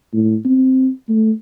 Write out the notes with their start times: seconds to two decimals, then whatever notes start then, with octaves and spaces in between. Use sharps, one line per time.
0.14 A2
0.45 C4
1.09 A3